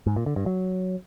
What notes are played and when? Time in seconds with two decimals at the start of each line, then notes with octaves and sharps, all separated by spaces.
0.06 G#2
0.16 A#2
0.26 D3
0.36 G2
0.46 F#3